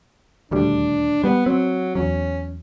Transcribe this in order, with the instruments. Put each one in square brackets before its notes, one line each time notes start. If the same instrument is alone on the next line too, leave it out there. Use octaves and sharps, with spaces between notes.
[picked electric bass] D#1 D2 G3 [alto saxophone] D4
[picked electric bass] G3 [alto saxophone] B3
[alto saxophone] F#3 [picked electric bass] C4
[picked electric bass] E2 F#3 [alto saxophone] C#4